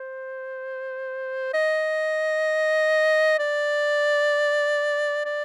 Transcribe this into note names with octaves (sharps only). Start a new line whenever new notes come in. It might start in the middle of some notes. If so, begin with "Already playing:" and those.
Already playing: C5
D#5
D5
D5